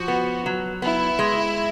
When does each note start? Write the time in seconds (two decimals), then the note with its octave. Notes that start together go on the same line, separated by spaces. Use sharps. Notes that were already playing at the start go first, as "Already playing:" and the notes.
Already playing: F3 F#4
0.08 B3
0.46 F#3
0.82 B3 E4
1.19 G#3